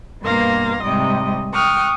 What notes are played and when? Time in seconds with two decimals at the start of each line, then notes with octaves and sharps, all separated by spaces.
0.22 G2 B2 A#3 F5 C6 A#6
0.83 G#2 C3 G3 D#5
1.53 G5 C#6 D#6 F6 F#6